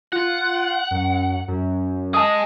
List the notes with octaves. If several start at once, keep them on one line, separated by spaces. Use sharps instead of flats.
F4 F#5
F#2
F#2
G#4 D#5 A5 D#6